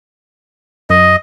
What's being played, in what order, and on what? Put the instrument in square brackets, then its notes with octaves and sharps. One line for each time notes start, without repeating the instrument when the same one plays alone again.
[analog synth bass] F#2 [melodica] D#5